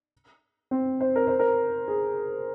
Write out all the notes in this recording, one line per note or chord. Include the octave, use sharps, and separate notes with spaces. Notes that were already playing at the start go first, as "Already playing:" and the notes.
C4
C5
A#4
C5
A#4
G#4